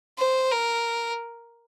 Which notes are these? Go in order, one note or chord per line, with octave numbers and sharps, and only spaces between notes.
C5
A#4